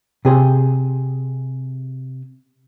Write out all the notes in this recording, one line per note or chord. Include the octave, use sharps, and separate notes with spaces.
C3 G#4 C5